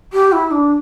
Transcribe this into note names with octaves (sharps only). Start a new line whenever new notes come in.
G4
E4
D4